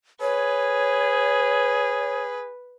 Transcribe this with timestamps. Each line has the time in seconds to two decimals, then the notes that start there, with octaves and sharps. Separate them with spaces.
0.21 G#4 B4 C#5